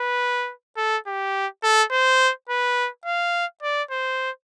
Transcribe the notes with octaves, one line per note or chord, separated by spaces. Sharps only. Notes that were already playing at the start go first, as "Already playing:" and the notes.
Already playing: B4
A4
G4
A4
C5
B4
F5
D5
C5